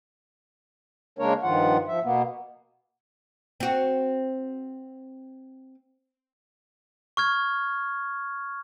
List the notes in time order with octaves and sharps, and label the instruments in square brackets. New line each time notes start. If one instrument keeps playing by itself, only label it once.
[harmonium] C#3 G#3 A#3 D4 A#4 C#5
G2 D#3 F3 F4 F#5
F3 E5
B2 A#3 B3
[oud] C4 F#4
[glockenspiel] C#6 F6 G#6